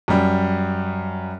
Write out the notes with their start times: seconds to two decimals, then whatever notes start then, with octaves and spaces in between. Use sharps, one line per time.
0.08 F#2 G3